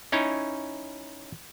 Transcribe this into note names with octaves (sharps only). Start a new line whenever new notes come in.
C#4 D#4 E4 C#5